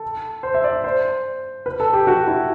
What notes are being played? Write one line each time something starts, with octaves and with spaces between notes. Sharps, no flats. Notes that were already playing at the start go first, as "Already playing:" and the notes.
Already playing: A4
C5
E5
D5
C5
B4
A4
G4
F#4
E4